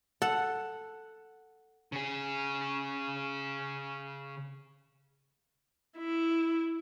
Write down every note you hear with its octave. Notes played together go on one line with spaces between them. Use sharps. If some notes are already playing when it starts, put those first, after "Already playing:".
A4 F#5
C#3 G#4
E4